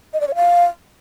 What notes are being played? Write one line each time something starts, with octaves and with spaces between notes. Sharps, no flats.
D#5
D5
C#5
F5